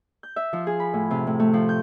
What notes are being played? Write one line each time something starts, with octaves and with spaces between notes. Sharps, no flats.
G6
E5
F3
G#4
B5
A2
C3
A2
A3
F3
G6